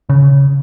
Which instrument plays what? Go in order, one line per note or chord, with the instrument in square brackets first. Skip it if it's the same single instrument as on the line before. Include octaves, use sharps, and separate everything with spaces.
[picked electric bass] C#3